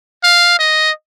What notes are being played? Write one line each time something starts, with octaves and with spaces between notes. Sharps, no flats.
F5
D#5